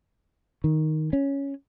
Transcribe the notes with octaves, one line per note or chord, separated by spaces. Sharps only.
D#3
C#4